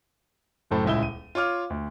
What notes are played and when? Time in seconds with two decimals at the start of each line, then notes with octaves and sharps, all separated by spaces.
0.71 F#1 F#2 A2 A4 C5
0.85 D#1 C#2 E4 E6 G7
1.03 D#7
1.35 F4 C#5 D6 F6
1.70 D2